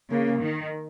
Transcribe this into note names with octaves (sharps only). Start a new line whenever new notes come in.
C#3 A#3
D#3